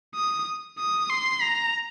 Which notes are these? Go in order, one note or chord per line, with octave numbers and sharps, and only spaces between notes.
D#6
D#6
C6
A#5